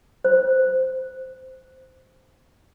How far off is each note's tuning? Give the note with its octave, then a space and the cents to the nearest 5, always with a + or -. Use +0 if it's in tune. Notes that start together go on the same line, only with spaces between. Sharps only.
C5 -10